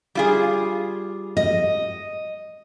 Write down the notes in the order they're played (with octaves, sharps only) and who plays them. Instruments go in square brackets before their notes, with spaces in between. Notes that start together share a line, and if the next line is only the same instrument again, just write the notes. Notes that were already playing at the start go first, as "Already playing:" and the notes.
[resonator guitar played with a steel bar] G3 F4 G#4
[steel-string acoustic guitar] D#5